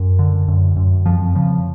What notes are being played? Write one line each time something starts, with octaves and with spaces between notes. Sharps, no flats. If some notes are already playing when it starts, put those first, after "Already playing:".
Already playing: F#2
D3
F#2
F#2
F2 F3
C#3 F3